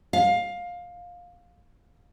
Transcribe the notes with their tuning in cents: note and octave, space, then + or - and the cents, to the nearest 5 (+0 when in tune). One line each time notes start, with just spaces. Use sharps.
F5 +15